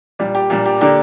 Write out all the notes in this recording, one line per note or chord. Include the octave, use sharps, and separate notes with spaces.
A#2 G3 D4
G4
A#2 G3 D4
G4
D3 A#3 D4 G4